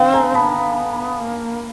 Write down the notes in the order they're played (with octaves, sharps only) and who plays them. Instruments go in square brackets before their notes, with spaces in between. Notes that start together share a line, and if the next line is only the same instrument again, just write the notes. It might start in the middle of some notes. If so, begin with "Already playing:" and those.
Already playing: [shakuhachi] C4 [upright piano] F5 G5
[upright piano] G#5 A#5
[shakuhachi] B3 [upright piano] A5 B5
[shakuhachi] A#3